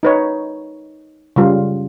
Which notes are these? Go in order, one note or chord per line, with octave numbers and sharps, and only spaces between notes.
D#4 B4 C#5
C#3 G3 F4